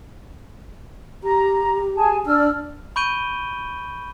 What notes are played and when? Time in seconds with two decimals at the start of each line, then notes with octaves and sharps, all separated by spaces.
1.23 G4 A#5
1.96 G#4 G#5 A5
2.26 D4 D5 E6 F6
2.96 B5 C#6 G6 D7 D#7 G7